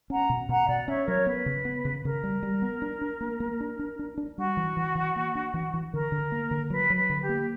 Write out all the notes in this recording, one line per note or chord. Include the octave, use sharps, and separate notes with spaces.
C#4 F#5 A#5
B2
B2 F#5 A#5
B2 D5 F#5
C#4 C#5 E5
F#3 A#4 C#5
B3 B4
C#3
B3
C#3
C#3 A#4
G3
G3
B3
D4
D4
A#3
A#3
D4
D4
D4
D4
G3 F#4
E3
E3
E3
A#3
D4
E3
E3
D3 A#4
D3
A#3
D3
F#3 B4
F#3
B4
D3
G4
A#3